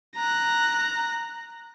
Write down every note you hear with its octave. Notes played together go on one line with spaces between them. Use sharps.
A#5 F#6